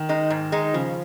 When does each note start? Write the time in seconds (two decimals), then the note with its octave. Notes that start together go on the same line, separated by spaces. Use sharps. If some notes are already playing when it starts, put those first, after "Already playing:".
Already playing: D#3
0.09 G#3 D#4
0.30 G#2
0.52 G#3 D#4
0.74 C#3 F3